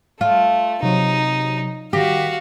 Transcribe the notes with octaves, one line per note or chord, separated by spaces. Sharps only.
A3 F4
C3 F#3 D#4
D#3 F#4 G4 F5 A#6 B6